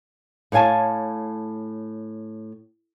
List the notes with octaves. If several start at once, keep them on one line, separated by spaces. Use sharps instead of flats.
A2 C#5 F5 G#5 A5